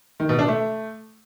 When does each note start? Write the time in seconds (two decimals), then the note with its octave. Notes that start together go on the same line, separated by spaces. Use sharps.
0.20 D#3
0.29 B2
0.39 D4
0.48 A3